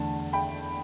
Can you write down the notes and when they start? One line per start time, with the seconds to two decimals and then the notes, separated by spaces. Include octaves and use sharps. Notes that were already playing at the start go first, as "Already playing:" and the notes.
Already playing: E2 D3 A3 D4 A5
0.33 G5 B5